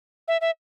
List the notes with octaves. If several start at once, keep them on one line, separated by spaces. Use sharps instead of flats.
E5
E5